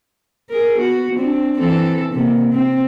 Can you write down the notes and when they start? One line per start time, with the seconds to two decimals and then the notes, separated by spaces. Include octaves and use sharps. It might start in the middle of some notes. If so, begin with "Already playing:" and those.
0.50 G#4 A#4
0.78 B3 F#4
1.15 C4 D4
1.59 E3 C4 A4
2.12 C3 A#3
2.53 C4